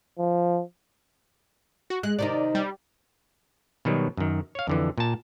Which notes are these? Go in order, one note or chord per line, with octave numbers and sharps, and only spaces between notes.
F3
F#4
G#3 F#6
C3 D#3 D#4 D5
G3
B2 D#3 F#3 G3
F#2 D#3
C#5 F5
F2 D3 E3
A#2 A5